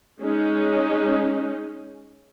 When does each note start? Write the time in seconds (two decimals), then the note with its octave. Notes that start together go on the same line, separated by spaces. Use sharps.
0.20 G#3 C#4 D#4